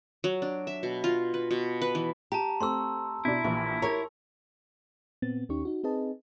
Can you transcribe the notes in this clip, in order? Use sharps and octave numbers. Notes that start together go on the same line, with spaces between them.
F#3
D4
E5
B2
F4
B4
B2
B4
E3
G4 A5 A#5
A3 C4 C6 C#6 E6
B2 D4 E4
A#1 E3 G4
G4 A#4 C#5 A#5
A#2 B3 C4 A6
D#2 C#4 D#4 G4 C#6
D#4 F#4
C4 D#4 G#4 B4 D#5 A5